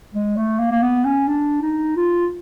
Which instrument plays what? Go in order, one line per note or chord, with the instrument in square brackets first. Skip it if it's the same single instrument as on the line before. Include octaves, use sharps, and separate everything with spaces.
[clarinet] G#3
A3
A#3
A#3
B3
C#4
D4
D#4
F4